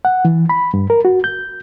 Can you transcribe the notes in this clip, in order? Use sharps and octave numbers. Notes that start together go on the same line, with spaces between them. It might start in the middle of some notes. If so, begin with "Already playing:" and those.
F#5
E3
B5
G2
A#4
F#4
G6